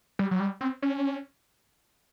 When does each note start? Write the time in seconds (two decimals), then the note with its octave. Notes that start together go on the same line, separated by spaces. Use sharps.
0.19 G3
0.31 F#3
0.40 G3
0.61 C4
0.82 C#4